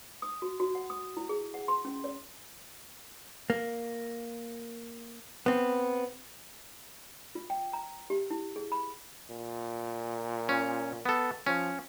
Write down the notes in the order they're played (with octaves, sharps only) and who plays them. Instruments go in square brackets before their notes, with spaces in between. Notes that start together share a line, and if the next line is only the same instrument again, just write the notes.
[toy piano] D#6
F#4
F#4
F#5
D#6
E4
G#4
F#5
C6
C#4
C#5
[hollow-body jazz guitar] A#3
B3 C4
[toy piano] F4
G5
A#5
G4
E4
G#4
B5
[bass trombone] A#2
[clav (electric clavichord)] C#4
B3 A4
[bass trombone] F3 [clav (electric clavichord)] C#4